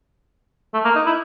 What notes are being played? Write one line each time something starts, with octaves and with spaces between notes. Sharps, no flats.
A3
A#3
D#4
E4